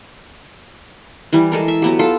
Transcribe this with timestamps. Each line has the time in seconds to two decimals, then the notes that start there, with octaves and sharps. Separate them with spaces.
1.33 E3 G3
1.52 G#3 A4 A#4
1.68 E5
1.82 F#3 B3 G4
1.99 F4 A4